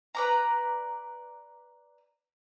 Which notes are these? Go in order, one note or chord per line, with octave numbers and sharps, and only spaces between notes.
B4 D5 A#5